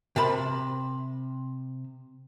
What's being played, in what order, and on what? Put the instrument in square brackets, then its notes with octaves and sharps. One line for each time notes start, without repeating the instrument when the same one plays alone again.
[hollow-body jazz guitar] C3 A#4 A5 B5